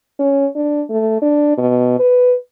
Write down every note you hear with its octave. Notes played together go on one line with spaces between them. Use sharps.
C#4
D4
A3
D4
B2
B4